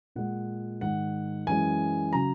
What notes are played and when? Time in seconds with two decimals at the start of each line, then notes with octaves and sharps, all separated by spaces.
0.16 A#2 G#3 F#5
0.81 G#2 D#3 G#3 F#5
1.47 F#2 E3 G#3 G#5
2.13 C#3 F#3 A#5